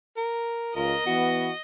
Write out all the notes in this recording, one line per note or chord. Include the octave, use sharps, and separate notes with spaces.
A#4
C#2 F4 A#4 D#5
E3 B3 F#4